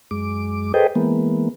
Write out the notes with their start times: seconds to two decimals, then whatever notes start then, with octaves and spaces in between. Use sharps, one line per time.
0.11 F#2 G#3 D6
0.74 G#4 A4 B4 C5 D#5 G5
0.95 E3 G#3 A#3 B3